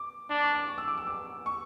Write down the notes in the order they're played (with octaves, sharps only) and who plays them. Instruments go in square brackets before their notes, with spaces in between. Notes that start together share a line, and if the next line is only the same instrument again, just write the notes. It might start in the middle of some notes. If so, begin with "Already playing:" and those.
Already playing: [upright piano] D6
[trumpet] D4 [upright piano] D6
[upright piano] C#6
D6
C#6
E6
D6
E6
D6
C#6